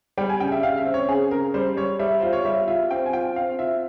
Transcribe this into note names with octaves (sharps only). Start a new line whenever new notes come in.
G3 G5
G#5
C#3 G5
E5
C#3 F5
E5
C4
C#5
C#3 G#4
C#3 A#4
G3 C5
G3 C#5
G3 E5
F4 C5
C#5
G3 E5
F4 E5
C4 G5
G#5
F4 G5
C4 F5
F4 E5